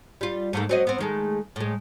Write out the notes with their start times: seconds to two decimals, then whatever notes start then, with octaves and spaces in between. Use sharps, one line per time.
0.21 G3 F4
0.53 G#2 A3 A#3
0.69 F#3 C4 D#5
0.87 B3 C4
0.98 D#3 G#3 A3
1.56 A2 G#3